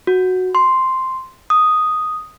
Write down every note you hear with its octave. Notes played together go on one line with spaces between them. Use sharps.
F#4
C6
D#6